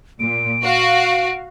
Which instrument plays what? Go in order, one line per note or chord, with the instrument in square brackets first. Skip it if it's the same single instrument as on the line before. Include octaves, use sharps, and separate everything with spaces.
[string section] A#2 [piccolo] D7
[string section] F#4 F5